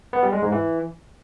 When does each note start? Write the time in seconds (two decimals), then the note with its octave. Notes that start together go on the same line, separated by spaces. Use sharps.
0.13 B3
0.23 G3
0.33 G#3
0.42 G#2
0.52 E3